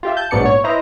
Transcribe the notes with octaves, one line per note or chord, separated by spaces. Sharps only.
F4 G4 E5
A5 G6
A#1 G#2 F#3 B3 D5 C#7
C#5
E4 B4 C5 D#5 A#5